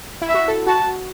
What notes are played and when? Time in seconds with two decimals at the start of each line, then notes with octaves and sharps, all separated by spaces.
0.22 E4
0.29 E5
0.34 F#4
0.48 A4
0.67 F#4 A5